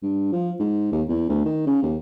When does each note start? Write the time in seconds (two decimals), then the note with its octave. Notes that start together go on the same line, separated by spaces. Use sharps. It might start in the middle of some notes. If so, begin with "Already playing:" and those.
0.03 G2
0.32 F3
0.60 G#2
0.92 D#2
1.09 E2
1.29 D2
1.45 D#3
1.67 C#3
1.83 D#2